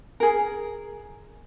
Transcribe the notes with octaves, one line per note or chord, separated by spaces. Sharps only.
G#4 A#4